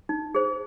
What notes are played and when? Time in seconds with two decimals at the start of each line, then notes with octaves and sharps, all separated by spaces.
0.09 D#4
0.35 G#4 C5